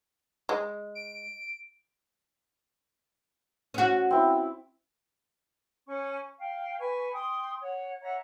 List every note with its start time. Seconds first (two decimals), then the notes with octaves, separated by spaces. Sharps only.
0.49 G#3
0.95 D7
3.74 C#4 F#4
4.11 C4 E4
5.87 C#4 G#5 C#6
6.38 F5 G5
6.78 B4 G#5 C#6
7.14 G5 C6 D#6
7.62 C#5 F#5
8.02 C#5 E5 F#5 A#5